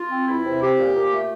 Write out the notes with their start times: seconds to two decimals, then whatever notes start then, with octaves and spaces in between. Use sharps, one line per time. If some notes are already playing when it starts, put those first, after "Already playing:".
Already playing: F4
0.10 C4
0.27 E2 E4
0.44 C3
0.61 C4 G4
0.77 A#2
0.95 A#2
1.11 A3